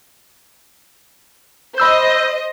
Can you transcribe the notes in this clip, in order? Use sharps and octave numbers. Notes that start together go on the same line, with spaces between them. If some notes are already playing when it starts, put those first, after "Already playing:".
C5 D#5 B5 E6 G6